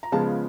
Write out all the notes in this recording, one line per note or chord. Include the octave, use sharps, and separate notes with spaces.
A#5
C#3 F3 G#3 B3 A5